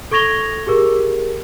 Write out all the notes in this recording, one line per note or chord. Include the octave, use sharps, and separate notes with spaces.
A4 C#6 G#6 A#6 F7 G7
G4 G#4 A#4